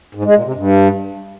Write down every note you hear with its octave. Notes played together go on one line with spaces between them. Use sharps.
G#2
G#3
A#2
C3
G2